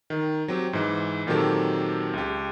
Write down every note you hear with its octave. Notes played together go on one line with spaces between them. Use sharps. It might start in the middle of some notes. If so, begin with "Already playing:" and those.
D#3
F#3 C4 G4
G#2 E3
A#2 D#3 F#3 C4 G4 A4
C#2 G4